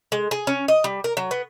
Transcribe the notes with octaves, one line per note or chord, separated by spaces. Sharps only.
G#3
G#4
C#4
D#5
G3
A#4
F#3
B3